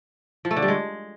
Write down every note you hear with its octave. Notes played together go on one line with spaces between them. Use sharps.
F3
A3
D3
G3
G#3